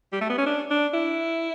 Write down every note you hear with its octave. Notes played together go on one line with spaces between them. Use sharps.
G3
A3
B3
C#4
D4
D4
E4